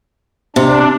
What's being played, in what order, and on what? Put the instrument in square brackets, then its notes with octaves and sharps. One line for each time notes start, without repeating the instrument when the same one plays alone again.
[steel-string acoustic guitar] C3 [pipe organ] D4